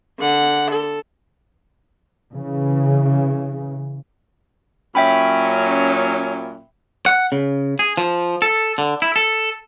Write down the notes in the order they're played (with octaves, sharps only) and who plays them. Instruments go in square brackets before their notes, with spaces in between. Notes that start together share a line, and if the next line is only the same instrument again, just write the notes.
[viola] D3 F#5
A4
[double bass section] C#3 E3
[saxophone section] A#2 F#3 C#4 [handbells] E5 G5 B5
[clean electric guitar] F#5
C#3
G#4
F3
A4
D3
E4
A4